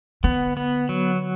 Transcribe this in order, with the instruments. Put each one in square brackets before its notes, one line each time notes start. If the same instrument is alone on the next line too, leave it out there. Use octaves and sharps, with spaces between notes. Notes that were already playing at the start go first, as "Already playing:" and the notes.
[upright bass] D3 [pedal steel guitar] B3
[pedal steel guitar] B3
F#3